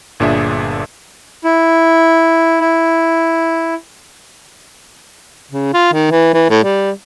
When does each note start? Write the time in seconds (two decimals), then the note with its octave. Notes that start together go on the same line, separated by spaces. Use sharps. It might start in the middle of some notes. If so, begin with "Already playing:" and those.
0.20 G1 A#2 D4 G#4 E5
1.44 E4
2.61 E4
5.51 C#3
5.74 F4
5.93 D#3
6.11 E3
6.34 E3
6.50 A2
6.64 G3